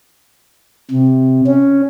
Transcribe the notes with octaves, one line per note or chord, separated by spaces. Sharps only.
C3
C#4